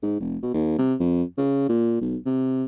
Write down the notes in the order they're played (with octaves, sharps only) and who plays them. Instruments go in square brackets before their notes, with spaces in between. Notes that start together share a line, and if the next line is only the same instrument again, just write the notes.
[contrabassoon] G#2
F1
B2
D#2
C3
F2
C#3
A#2
B1
C3